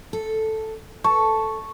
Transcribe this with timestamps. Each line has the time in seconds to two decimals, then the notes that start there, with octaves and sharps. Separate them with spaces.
0.13 A4
1.04 A4 A5 C#6